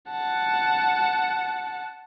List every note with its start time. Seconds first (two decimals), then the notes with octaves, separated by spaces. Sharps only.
0.11 F#5 A5